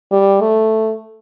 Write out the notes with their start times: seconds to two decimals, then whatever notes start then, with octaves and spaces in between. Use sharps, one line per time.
0.11 G3
0.41 A3